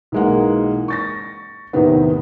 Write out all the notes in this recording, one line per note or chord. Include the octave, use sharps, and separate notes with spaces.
B1 E3 G#3 A#3 F#5
C#6 A6 A#6
E2 A2 C3 D#3 E3 B3